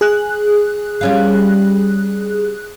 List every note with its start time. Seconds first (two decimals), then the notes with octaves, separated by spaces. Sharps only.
0.01 G#4 F#6
1.01 G3 C#4 F4